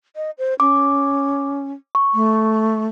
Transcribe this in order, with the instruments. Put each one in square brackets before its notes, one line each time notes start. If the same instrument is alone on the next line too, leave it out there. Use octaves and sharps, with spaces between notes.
[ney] D#5
C5
[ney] C#4 [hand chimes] D6
[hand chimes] C#6
[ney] A3